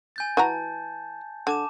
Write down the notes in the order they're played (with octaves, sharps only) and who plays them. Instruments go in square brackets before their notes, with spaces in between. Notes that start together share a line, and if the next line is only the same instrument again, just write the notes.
[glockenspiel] G#5 G6 A6
[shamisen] E3 F#4 A#5 [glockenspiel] A5
[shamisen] D3 [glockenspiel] A5 D6 E7